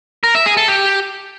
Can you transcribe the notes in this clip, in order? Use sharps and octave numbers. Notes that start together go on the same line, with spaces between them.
A#4
E5
G#4
A4
G4